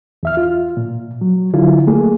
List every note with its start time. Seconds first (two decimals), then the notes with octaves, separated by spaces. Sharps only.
0.23 E2 E5 F6
0.37 F4
0.77 A#2
1.21 F#3
1.54 D3 F#3 E4 F4
1.87 A3 A#3 G#4